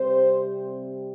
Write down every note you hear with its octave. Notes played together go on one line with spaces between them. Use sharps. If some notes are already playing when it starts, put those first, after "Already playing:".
Already playing: C3 G3 C4 C5